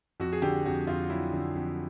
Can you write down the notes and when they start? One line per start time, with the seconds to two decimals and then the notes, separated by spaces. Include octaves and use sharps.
0.20 F2 F#4
0.33 G#4
0.42 D3 G4
0.66 F2 F#4
0.87 F2 F4
1.10 F#3 E4
1.33 D3
1.55 F2